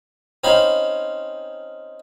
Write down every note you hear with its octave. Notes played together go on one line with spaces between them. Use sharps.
C4 C#4 D#4 F5 B5